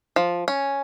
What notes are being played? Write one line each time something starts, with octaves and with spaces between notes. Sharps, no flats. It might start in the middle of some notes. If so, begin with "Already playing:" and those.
F3
C#4